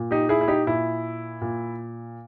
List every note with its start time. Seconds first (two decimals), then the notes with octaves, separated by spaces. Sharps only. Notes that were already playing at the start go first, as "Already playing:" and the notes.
Already playing: A#2
0.11 D#4 G4
0.29 E4 G#4
0.41 E4
0.48 D#4 G4
0.66 A#2 E4
1.41 A#2